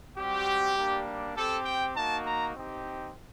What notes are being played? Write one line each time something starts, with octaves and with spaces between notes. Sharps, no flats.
G3 C4 F#4 G4
G3 A#3 D4
C4 G4 A4
G5
A#3 D#4 F#4 A5
A#5
C4 D#4 G4